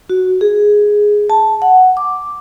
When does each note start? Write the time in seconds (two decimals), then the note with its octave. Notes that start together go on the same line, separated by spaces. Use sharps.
0.10 F#4
0.41 G#4
1.30 A5
1.62 F#5
1.97 D6